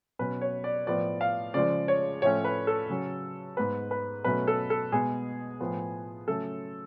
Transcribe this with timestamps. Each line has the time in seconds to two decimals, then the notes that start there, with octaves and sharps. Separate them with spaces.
0.19 B2 F#3 C#4 B4
0.41 C#5
0.64 D5
0.87 A2 F3 B3 D5
1.21 F5
1.54 C#3 F3 G#3 D5
1.88 C#5
2.22 A2 F3 A3 C#4 C#5
2.45 B4
2.67 A4
2.89 C#3 F#3 C#4
3.57 G#2 G#3 B3 B4
3.91 B4
4.24 B2 F#3 A3 C#4 B4
4.47 A4
4.70 A4
4.92 B2 G#3 B3 G#4
5.60 A2 F3 B3
6.28 C#3 F#3 A3 C#4 A4